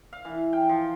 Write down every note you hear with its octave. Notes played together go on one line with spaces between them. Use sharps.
F5
E3
G5
F3